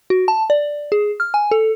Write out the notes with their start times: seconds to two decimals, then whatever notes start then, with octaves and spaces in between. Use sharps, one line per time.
0.10 F#4
0.28 A5
0.50 D5
0.92 G#4
1.20 F6
1.34 G#5
1.51 A4